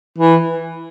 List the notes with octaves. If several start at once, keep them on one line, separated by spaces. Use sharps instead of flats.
E3